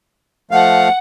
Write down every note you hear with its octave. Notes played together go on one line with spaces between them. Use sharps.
F3 A3 F5 F#5